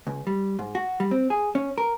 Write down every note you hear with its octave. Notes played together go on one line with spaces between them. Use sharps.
C#2
G3
G#2
F#4
G3
C4
G#4
C#4
A#4